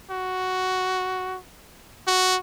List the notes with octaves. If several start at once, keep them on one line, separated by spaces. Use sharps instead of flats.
F#4
F#4